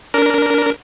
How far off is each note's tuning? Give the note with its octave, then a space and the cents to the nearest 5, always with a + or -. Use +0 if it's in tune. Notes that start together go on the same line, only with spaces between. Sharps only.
D4 -25 A#4 +0